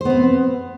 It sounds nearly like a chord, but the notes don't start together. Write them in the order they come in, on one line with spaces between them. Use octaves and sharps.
C5 B3 C4